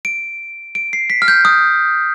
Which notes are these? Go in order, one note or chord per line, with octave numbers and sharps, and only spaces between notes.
D7
D7
C7
B6
F6
G6
D#6